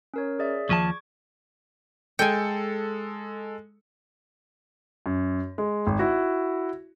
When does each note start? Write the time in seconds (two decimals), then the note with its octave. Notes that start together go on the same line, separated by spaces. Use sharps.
0.14 C#4 A#4 C#5
0.39 G#4 D5 E5
0.69 D#2 F3 A5 C#6 D6 G#6
2.19 G#3 A4 G5 G#5 C#7
5.06 F#2
5.58 G#3
5.87 G#1
5.99 E4 F#4